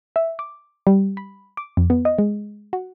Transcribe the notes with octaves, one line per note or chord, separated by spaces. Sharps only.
E5
D6
G3
B5
D6
F2
B3
D#5
G#3
F#4